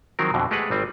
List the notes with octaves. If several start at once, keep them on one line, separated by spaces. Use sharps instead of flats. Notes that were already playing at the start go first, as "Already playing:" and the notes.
D#3 F3 F#3 C4 A#4
F2 B2 D3 E3
G#3 A3 G4 G#4 B4 F#5
G#1 G3 C4